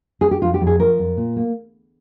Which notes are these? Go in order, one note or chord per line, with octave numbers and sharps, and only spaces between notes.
G#4
G4
F2 F4
G4
F2
G#4
F3 A#4
F2
A#2
A#3